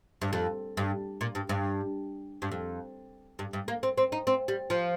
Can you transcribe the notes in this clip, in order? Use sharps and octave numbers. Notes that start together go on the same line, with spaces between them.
G2
F2
G2
A#2
G2
G2
G2
F2
G2
G2
A#3
C4
C4
D#4
C4
G3
F3